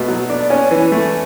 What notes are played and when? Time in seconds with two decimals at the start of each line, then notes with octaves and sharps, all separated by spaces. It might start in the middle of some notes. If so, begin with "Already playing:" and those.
Already playing: B2 A3
0.08 F#3
0.30 D4
0.50 C#4
0.71 E3
0.92 A3